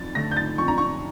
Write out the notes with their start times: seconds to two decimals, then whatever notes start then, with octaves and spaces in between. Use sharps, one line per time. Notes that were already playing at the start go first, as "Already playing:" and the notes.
Already playing: F2 A6
0.15 D3 A3 A#6
0.31 G6
0.36 A6
0.58 F2 C#6
0.68 A#5
0.78 C#6